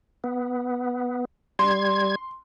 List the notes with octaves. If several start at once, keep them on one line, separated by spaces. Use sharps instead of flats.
B3
G3 C6 G#6